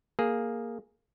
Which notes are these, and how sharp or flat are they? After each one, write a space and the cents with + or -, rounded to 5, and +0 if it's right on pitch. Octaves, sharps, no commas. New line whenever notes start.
A#3 +0 G#4 +0